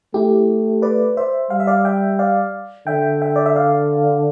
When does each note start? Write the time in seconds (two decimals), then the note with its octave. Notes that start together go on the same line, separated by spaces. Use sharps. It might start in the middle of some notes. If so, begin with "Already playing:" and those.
0.14 A3 E4 G4
0.82 B4 D5
1.17 C5 E5
1.50 G3 F5
1.60 E5
1.67 D5 F5
1.85 E5 G5
2.19 D5 F5
2.87 D3 E5 G5
3.21 E5 G5
3.36 D5
3.46 E5
3.56 D5 F5